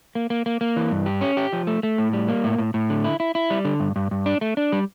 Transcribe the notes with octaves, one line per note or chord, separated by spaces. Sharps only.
A#3
A#3
A#3
A#3
E3
G2
G4
C#4
G4
F3
A3
A3
A2
G3
A#3
A2
A2
A2
D3
E4
E4
E4
G3
D3
G2
G2
G2
D4
A3
D4
G3